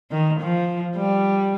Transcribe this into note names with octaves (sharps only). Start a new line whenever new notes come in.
D#3
F3
G3